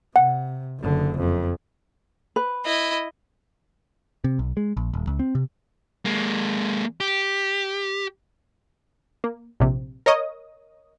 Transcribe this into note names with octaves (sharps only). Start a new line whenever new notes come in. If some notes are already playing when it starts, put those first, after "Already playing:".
C3 F#5
F#1 D3
F2
B4
E4 D#5
C3
B1
G#3
A#1
D#1
C#2
C4
C3
G#3 A#3
G4
A#3
A#1 C3
A#4 C#5 D#5 D#6